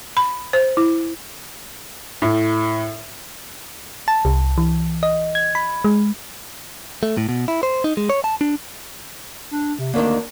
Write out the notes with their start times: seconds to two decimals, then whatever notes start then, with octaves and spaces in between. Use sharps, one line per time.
0.17 B5
0.53 C5
0.77 E4
2.22 A2
4.08 A5
4.25 C2
4.58 E3
5.03 D#5
5.35 G#6
5.55 B5
5.84 G#3
7.03 A3
7.17 A2
7.29 B2
7.48 E4
7.63 C5
7.84 D#4
7.97 G#3
8.10 C#5
8.24 A5
8.41 D4
9.51 D4
9.79 C3
9.94 D2 D#3 A#3 D4